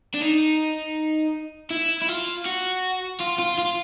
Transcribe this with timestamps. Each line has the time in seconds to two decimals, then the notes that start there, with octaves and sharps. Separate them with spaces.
0.14 D4
0.21 D#4
1.71 E4
2.01 E4
2.08 F4
2.45 F#4
3.20 F4
3.39 F4
3.58 F4